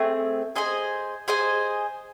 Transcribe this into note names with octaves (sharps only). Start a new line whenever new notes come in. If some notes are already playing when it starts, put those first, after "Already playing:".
Already playing: A3 C4 G#4
G#4 C5 D#5 G#5
G#4 C5 D#5 G#5